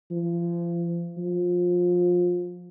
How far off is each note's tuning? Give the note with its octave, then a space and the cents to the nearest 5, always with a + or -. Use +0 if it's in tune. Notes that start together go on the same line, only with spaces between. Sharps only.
F3 -35
F3 +20